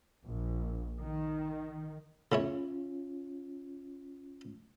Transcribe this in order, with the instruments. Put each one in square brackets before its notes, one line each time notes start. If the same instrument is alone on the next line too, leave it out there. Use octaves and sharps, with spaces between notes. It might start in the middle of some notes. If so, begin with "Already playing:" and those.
[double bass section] A#1
D#3
[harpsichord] C#3 E4 C#5 [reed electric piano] C#4 F4